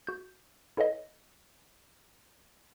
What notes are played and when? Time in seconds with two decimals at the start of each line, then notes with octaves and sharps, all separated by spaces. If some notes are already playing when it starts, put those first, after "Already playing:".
0.07 F#4 G6
0.77 E4 A4 B4 C#5 D#5